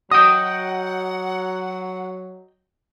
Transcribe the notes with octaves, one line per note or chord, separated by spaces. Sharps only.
F#3 D#5 F#5 G5 D#6